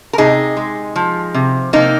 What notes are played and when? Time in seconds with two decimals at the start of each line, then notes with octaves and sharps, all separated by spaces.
0.13 A#4
0.18 C3 D#4 G#4
0.57 G#3
0.96 F3
1.34 C3
1.73 C3 A#3 D#4